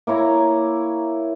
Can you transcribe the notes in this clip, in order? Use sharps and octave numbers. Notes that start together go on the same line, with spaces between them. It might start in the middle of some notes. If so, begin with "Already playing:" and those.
A#3 E4 C#5 A#5